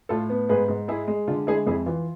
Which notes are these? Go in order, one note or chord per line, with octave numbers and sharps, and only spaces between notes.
A2 F4 A4
B3
G#2 G#4 B4
G#2
G#3 E4 G#4
G#3
D3 F4
G#3 E4 G#4
F2 E4 G#4
E3 F4